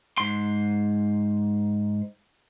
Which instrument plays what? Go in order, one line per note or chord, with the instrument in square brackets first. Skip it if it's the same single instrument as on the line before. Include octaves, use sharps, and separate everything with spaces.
[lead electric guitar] G#2 C6